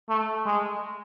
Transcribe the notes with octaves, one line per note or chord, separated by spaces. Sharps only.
A3
G#3